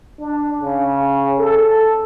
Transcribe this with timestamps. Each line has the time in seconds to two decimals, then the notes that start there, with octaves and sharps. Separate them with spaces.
0.20 D4
0.61 C#3
1.39 A4